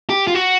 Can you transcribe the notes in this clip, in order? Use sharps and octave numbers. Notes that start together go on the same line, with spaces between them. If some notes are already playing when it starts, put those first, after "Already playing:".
G4
F4
F#4